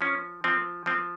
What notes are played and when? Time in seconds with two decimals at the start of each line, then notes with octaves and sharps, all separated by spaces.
0.01 F3 C#4
0.44 F3 C4
0.86 F3 C4